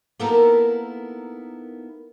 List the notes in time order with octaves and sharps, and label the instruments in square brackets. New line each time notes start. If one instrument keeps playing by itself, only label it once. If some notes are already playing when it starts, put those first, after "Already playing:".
[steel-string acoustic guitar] A#3 B3 D#4 E4 A4 A#4